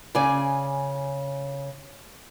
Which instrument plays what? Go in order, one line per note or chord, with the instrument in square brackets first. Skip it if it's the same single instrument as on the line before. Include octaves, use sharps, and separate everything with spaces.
[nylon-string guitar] C#3 D5 G#5